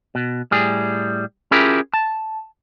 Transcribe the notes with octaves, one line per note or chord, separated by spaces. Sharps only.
B2
A2 G3 G#4
C#4 E4 F4 G4 G#4 A#4
A5